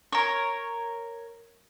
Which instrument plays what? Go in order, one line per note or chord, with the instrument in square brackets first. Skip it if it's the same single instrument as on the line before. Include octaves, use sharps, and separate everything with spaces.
[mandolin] A#4 C#5